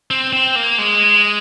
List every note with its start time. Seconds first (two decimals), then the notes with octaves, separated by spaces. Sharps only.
0.11 C4
0.33 C4
0.56 A#3
0.78 G#3